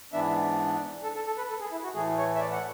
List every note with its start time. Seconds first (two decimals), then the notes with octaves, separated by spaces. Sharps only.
0.13 G#2 E3 B3 D4 E5
1.03 A4
1.15 A4
1.27 A4
1.38 B4
1.49 A4
1.60 G#4
1.72 E4
1.84 F#4
1.94 A2 E3 A3 G#4
2.18 C#5
2.35 E5
2.40 D5
2.52 F#5